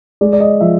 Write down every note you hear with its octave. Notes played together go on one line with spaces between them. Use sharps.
G#3 D5
D5
D#5
F3 E5